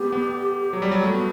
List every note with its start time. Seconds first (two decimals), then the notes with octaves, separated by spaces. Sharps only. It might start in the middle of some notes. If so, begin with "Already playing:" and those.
Already playing: A3 B3 G4
0.12 B3
0.73 F#3
0.82 G3
0.91 F#3
1.03 A3 F#4
1.14 B3